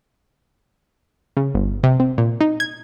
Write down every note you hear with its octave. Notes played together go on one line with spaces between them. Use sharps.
C#3
G1
C3
C4
A#2
D#4
G#6